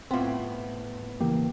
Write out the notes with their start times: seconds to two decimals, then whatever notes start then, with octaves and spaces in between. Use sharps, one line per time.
0.11 A2 B3 C4 F4
1.21 C#3 E3 A#3 G4